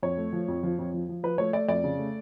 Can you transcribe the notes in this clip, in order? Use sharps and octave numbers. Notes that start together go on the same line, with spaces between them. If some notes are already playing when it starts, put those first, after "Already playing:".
F2 C#5
A3
F3
F2
F3
F2
F3
F3
F3 B4
A3 C#5
A3 D5
F2 D5
C#3
A3